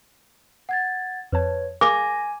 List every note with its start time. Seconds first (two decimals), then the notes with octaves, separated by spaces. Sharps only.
0.69 F#5 G#6 A6
1.32 F2 B4 C#5 A5 G#6
1.81 G#4 A#4 F5 G#5 D6 A#6